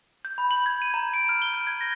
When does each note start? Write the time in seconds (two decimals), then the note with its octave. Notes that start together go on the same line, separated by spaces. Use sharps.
0.25 G6
0.38 B5
0.51 F#7
0.66 G#6
0.82 D#7
0.94 A#5
1.14 D7
1.29 F6
1.42 G7
1.53 G6
1.67 G#6
1.81 A#6